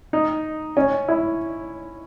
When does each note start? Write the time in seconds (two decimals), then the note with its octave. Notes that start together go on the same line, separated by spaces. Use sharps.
0.13 D#4
0.77 C#4
1.08 E4